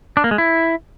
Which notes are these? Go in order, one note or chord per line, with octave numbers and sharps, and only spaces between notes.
D4
A#3
G#3
E4